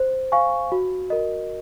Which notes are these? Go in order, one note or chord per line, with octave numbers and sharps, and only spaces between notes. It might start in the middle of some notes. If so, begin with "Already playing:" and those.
Already playing: C5
F5 G#5 C#6
F#4
A#4 D#5